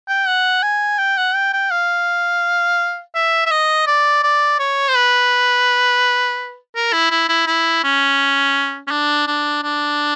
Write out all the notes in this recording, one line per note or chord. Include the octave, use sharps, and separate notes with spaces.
G5
F#5
G#5
G5
F#5
G5
G5
F5
E5
E5
D#5
D5
D5
C#5
C5
B4
A#4
E4
E4
E4
E4
C#4
C#4
D4
D4
D4